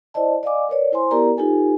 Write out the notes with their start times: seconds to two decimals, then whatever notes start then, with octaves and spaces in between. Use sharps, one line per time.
0.14 E4 C5 D5 D#5 A5
0.43 D5 D#5 F5 G#5 D6
0.69 A#4 B4 C#5 D5
0.92 E4 C5 G#5 C6
1.11 B3 E4 G4 A#4 D5 A#5
1.37 D#4 F4 G4 A4 B4 G#5